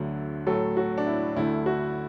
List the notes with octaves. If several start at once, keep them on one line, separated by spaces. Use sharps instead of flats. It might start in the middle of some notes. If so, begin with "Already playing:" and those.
Already playing: D2 D3 F#3 A3
A2 F#3 A3 A4
F#4
D4
E4
D2 D3 A3 E4
F#4